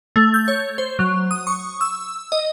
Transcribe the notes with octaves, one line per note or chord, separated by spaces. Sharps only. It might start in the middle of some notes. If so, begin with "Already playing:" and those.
A3
G6
C#5
C5
F#3
D#6
C#6
E6
D#5